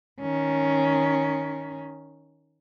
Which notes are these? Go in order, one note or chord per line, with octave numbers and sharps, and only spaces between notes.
D#3 C#4